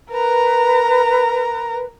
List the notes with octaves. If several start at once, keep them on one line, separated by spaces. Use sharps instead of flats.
A#4 B4 A#5